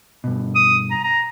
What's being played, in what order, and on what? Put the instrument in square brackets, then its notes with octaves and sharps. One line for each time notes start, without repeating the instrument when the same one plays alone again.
[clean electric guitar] G2 B2
[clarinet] D#6
A#5
A#5